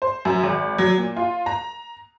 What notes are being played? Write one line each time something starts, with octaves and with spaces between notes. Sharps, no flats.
C5
F#2
G#1
F#3
A#2
F4
A#5